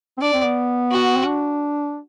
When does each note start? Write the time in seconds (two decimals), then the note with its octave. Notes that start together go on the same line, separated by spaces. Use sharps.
0.18 C4
0.21 D4 D5
0.33 C4
0.45 B3
0.91 F#4
1.16 C4
1.26 D4